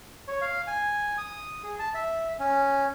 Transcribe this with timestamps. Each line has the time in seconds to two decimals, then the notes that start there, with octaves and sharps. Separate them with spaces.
0.28 C#5
0.41 F5
0.67 G#5
1.18 D#6
1.63 G#4
1.79 A5
1.94 E5
2.39 C#4